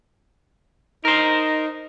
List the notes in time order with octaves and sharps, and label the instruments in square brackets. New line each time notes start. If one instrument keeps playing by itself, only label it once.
[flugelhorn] D#4 [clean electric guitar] A#4 C5